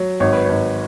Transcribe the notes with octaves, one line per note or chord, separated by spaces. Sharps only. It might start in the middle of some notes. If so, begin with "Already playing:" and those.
Already playing: F#3
G#1 C#5
B4
G#1 C#5